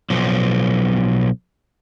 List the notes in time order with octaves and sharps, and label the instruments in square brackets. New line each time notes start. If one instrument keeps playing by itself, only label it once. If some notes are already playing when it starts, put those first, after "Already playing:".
[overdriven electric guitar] B1 F3